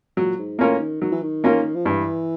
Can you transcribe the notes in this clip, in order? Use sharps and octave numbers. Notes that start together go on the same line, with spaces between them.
A#2 F#3
G#2
A2 A#3 C#4 F4 A#4
D#3
D#3 F#3
E3
D#3
A#3 C#4 F4 A#4
F3
G2 E3